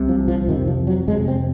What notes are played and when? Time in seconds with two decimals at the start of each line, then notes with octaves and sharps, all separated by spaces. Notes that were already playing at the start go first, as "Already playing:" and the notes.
Already playing: C2 C3
0.09 F3
0.28 F3
0.48 F2 C3 D#3
0.68 F3
0.87 F#3
1.07 F2 G#3
1.11 C3
1.28 C4